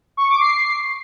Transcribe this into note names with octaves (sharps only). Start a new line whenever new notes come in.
C#6
D6
C7